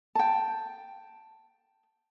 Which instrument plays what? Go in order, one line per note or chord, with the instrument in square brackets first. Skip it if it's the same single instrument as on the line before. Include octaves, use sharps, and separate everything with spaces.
[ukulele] G5 A5